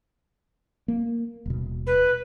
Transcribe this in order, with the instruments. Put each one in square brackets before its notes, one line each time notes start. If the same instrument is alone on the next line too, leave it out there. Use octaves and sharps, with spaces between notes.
[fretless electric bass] A#3
D#1 B2
[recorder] B4